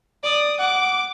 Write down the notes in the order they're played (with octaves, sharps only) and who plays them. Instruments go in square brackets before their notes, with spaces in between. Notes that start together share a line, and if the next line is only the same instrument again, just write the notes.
[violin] D5 [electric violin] D#6
[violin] F#5 [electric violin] D6